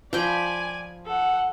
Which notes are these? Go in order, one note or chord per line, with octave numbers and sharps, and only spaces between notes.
F3 D5 G5 G#5 B5
A4 F#5